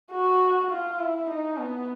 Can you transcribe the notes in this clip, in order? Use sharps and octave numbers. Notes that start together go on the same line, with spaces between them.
F#4
F4
E4
D#4
B3